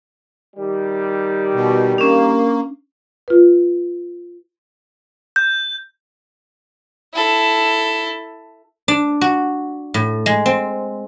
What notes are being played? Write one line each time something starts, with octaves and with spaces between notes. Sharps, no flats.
D#3 G3
B2
A#3 C#4 D4
F4 B4
G6
E4 A4
D4
F#4
A2
G#3
C4